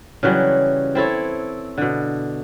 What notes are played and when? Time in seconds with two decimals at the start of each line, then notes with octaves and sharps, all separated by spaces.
0.23 C#3 E3 F#3 G3
0.95 C4 E4 A4 C#5
1.78 B2 D3